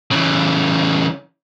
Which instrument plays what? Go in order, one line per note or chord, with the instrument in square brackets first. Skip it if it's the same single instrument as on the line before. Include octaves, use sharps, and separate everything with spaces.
[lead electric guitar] C#3 E3